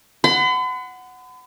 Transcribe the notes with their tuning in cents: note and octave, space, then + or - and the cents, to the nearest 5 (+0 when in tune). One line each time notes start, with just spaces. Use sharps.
F#5 +0 B5 +45